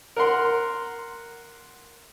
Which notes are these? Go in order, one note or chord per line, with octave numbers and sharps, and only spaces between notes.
A#4 F#5 C6